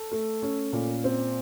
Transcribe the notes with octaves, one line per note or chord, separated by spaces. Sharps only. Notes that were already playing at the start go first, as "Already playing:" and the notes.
Already playing: A4
A3
C#4
A#2
C4